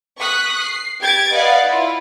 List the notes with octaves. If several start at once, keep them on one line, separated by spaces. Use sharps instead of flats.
C#6 D#6 F#6 B6
C7
G4 G#6 A6 D7
B4 D5 D#5 F5 F#5
E4 F4